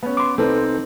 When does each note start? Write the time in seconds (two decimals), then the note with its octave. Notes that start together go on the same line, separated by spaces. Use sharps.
0.03 B3 C#4
0.17 C6 D6
0.38 C2 C4 D#4 A4 B4